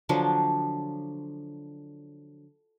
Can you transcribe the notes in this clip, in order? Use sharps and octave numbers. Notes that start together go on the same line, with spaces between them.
D3 F3 F#3 D4